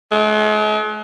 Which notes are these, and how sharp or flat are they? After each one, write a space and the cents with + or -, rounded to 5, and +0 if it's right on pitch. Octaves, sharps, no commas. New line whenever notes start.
G#3 +45